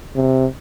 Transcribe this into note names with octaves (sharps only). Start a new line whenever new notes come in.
C3